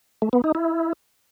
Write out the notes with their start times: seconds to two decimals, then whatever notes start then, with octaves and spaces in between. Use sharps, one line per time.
0.22 A3
0.33 B3
0.44 D#4
0.55 E4